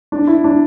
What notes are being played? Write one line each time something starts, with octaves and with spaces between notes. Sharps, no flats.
D4
E4
D4